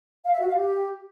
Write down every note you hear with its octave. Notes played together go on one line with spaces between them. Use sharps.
F5
E5
F#4
F5
G4